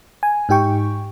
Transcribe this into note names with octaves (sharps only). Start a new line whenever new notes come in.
G#5
G#2 D#4 G4 G5 C#6